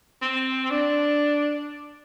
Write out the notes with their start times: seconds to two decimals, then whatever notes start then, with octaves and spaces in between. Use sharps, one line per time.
0.22 C4
0.71 D4